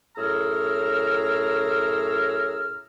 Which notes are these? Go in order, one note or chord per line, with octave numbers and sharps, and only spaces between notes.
F#2 A2 G#4 A#5 E6 F6